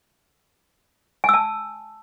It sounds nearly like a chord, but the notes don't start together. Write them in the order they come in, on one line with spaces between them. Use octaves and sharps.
G#5 E6 A5